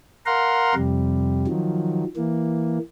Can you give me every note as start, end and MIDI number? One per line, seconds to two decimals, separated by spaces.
0.26 0.75 70
0.26 0.75 77
0.26 0.75 78
0.26 0.75 82
0.26 0.75 84
0.75 1.47 41
0.75 1.47 48
0.75 1.47 55
1.47 2.04 51
1.47 2.04 53
1.47 2.04 54
2.17 2.79 52
2.17 2.79 58